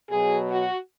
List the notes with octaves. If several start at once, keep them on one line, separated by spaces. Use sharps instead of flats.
B2 F#3 G#4
F#4